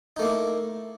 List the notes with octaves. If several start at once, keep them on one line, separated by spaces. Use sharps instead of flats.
A3 A#3 D#4 E4